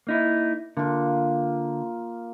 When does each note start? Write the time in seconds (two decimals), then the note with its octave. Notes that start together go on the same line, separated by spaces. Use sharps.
0.07 A#3 D#4 E4
0.77 D3 A#3 F4